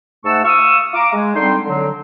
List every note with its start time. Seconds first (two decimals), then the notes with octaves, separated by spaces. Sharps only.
0.25 G#2 A3 F#5 A5 C#6 E6
0.44 F5 C#6 D#6 E6
0.94 F5 A#5 D6
1.13 G#3
1.35 D3 G3 C4 D#4 C6
1.64 D3 F#3